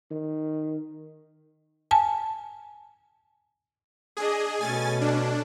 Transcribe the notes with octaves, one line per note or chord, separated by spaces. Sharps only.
D#3
G#5 A5
D4 G#4 D#5
B2 A3 C#4 G#5 A6
D4